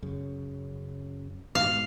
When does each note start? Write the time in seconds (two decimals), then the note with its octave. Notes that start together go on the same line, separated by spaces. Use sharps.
0.02 F#2 C#3
1.55 G#2 B2 F5